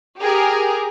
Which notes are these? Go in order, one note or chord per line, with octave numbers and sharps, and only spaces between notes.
G4 G#4 A#4